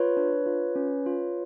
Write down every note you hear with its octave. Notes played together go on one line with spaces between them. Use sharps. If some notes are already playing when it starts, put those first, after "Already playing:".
Already playing: F4 B4 C#5
D4
F4
C#4
F4